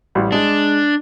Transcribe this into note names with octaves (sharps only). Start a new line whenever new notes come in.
A1 G3
G#3 D4